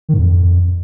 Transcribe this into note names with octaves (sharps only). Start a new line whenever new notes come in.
D#3
G#2
F2